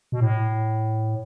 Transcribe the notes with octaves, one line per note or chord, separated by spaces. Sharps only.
B2
A2